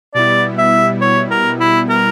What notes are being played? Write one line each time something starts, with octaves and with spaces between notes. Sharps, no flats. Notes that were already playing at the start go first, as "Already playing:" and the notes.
B2 G3 B3 E4 D5
E5
C#5
A#4
E4
A#4